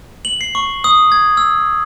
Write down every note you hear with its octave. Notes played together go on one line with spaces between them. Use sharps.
F#7
C7
C#6
D#6
G#6
E6